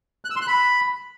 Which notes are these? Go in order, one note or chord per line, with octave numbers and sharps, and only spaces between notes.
F#6
E6
C6
F#6
B5